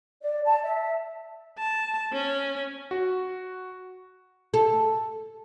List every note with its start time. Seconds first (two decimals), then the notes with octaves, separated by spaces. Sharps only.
0.21 D5
0.43 A5
0.63 E5
1.58 A5
2.13 C#4
2.91 F#4
4.54 A4